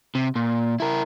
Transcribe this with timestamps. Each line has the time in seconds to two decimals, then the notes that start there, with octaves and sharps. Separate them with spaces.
0.15 C3
0.36 A#2
0.80 E4 A#4